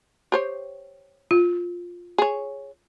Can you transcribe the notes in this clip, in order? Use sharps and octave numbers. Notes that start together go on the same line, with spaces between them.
G4 C5 C#5
F4
G#4 C#5